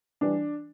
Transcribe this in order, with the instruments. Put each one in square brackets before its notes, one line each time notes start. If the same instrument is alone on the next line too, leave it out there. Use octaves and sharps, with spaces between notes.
[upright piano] E3 G3 D4